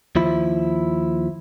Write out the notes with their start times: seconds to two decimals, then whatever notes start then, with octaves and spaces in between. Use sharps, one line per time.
0.16 D#2 F3 E4